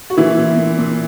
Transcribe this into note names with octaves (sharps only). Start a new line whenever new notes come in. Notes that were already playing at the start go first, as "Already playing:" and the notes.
F#4
A#2 E3 E4
A#2
A#2
A#2